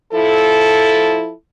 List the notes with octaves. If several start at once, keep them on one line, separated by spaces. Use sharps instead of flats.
F3 E4 A4